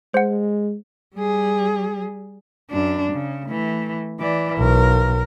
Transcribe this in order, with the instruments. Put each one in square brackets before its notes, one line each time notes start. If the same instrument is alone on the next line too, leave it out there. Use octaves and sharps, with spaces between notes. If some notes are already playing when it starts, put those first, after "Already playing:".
[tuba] G#3 [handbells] C5 F#5
[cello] G3 G#4
F#2 D4
C#3
E3 A3
E3 D5
[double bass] B1 [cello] A#4